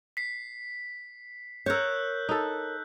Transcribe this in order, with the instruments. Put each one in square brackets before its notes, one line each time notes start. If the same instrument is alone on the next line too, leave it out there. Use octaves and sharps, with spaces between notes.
[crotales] B6 C7
[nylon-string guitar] A#4 C#5 [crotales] E6 F#6 G6
[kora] D#4 A4